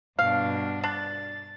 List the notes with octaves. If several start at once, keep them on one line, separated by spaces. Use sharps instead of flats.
G2 B2 D4 F5
D4 A6